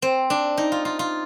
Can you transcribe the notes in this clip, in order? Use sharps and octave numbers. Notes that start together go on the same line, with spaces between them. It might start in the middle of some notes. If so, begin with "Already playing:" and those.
C4
D4
D#4
F4
F4
F4